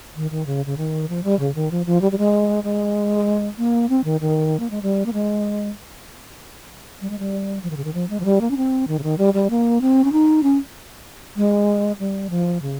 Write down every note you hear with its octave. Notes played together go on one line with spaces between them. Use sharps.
D#3
D#3
C#3
C#3
D#3
F3
G3
C#3
D#3
F3
F3
G3
G3
G#3
G#3
A#3
C4
D#3
D#3
A#3
G#3
G3
A#3
G#3
G3
G#3
G3
F3
D#3
C#3
D#3
F3
G#3
F3
G3
A#3
C#4
C4
D#3
C#3
D#3
G3
G3
A#3
C4
C#4
D#4
C#4
G#3
G3
F3
C#3